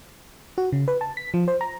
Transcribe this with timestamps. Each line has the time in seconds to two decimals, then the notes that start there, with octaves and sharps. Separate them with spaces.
0.58 F#4
0.72 C#3
0.88 B4
1.01 A5
1.17 B6
1.34 F3
1.48 C5
1.61 A#5